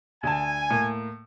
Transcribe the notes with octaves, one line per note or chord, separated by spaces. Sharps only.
D2 G#5 A5
A2 A#3